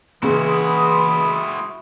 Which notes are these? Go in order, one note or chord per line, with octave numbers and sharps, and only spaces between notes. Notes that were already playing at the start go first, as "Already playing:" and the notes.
A#2 C#3 E3 E4 F#4 B5 C6 D#6